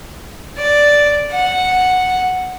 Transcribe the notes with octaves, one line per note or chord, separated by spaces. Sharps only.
D5
F#5